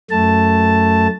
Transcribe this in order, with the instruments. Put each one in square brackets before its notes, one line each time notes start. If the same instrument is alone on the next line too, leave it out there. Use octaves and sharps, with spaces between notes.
[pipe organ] F#2 A3 A5